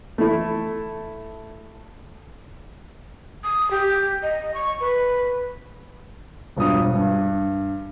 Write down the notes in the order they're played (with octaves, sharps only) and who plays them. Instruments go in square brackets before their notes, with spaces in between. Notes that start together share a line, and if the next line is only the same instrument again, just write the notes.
[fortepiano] A3 E4
[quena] D#6
G4
D#5
C#6
B4
[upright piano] E1 G2 F3 D#6
G2